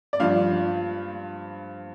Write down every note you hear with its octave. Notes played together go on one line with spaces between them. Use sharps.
D5
G2 F3 F5